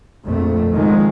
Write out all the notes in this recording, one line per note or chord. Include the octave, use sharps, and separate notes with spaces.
A#1 F2 A3
D#3 F3 G#3